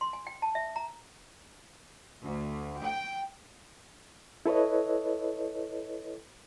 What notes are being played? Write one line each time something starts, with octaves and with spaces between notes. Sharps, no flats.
C6
G#5
G5
A5
E5
A#5
D2
G5
E4 A4 B4 C#5 D#5